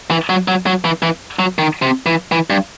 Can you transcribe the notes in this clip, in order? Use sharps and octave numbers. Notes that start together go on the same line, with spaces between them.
E3
F#3
F#3
F#3
E3
E3
F#3
D#3
C3
E3
E3
G2